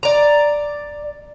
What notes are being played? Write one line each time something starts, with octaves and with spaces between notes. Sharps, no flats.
D5 A#5